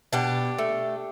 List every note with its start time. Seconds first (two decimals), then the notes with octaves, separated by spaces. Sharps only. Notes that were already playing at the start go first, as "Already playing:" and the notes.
0.13 B2 D4 G4
0.58 A3